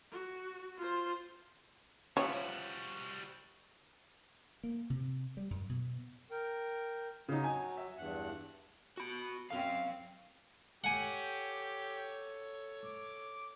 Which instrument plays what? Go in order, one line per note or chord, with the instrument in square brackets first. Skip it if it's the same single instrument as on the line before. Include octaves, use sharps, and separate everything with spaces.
[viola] F#4
F4 C5
[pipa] F3 [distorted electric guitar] G3 F#4 [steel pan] C#4 B4 E5 [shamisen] C#5
[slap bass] A#3
C3
G3
F#2
B2
[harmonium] A#4 G5
[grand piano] C#3 D#4 [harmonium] F#3
[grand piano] G#5
E5
[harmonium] E2 G2 F#5
[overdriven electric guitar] F#4 B5
[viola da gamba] F#2 C4 C#4 [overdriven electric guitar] F5
[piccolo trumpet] G4 [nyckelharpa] A4 C#5 [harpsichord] F#5 G#5
[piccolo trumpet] D6